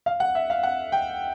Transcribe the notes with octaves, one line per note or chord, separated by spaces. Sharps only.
F5
F#5
E5
F5
F#5
G5